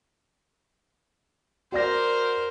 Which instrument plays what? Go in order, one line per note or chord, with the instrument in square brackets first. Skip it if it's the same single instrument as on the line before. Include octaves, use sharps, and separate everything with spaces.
[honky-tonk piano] F#4 D5 A#6 [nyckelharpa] A#4 C5